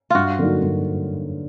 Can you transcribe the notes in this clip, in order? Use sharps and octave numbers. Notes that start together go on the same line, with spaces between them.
G2 F4 F#4
D3 F#3 A#3 D#4
G2